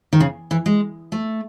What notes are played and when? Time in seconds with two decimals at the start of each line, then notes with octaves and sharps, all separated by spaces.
0.13 D#3
0.20 C#3
0.51 E3
0.66 G#3
1.12 A3